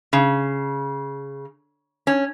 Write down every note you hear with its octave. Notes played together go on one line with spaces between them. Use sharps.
C#3
C#4